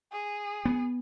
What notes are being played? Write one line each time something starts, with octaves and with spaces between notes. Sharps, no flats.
G#4
B3